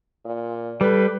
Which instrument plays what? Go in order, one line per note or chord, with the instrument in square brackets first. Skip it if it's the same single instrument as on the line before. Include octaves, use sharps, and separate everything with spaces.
[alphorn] A#2
[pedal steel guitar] G3 [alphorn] A4 [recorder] B4